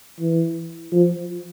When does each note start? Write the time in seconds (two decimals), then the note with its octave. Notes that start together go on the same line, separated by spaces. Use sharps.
0.20 E3
0.92 F3